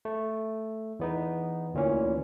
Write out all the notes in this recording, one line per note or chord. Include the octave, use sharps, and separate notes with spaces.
A3
E2 B3 D#4
D2 A#2 E3 C#4